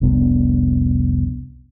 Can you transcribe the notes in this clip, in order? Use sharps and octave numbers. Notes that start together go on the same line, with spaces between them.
F1 C2 B3 D4